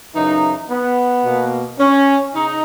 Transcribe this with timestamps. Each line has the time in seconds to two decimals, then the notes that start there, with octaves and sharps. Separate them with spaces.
0.14 F#2 C#3 E3 D#4
0.69 B3
1.24 B2 A#3
1.79 C#4
2.34 C#3 D#4